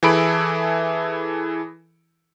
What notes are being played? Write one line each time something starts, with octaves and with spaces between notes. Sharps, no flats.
E3 E4 G#4 A4 B5 D7